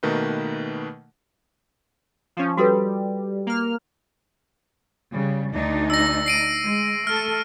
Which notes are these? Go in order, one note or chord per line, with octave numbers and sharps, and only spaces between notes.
B2 D#3 A3 A#3 B4
F3 C#4
G3 F#4 A4 B4
A#3 F6
C#3 G3
D2 D4 D#4
E6 A#6
C7 D7 D#7
G#3
A3 A4 F6